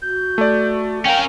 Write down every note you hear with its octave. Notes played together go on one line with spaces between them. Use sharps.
F#4 G6
A3 D5
C#4 A#4 F5 G5